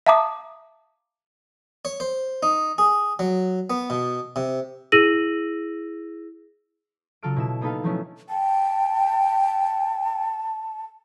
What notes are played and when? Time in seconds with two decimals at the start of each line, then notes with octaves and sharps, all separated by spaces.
0.06 E5 F5 A5 A#5 D6 D#6
1.85 C#5
2.00 C5
2.43 D#4
2.78 G#4
3.19 F#3
3.70 B3
3.90 B2
4.36 C3
4.92 E4 G#4 E6 A#6 D#7 F#7
7.23 C#3 F#3 F4 A4 F6 D7
7.36 B2 E4 E7
7.61 A#3 B3 D#4 A4 B4 F5
7.83 F3 F#3 A3 B3 C#4 E4
8.29 G5 A5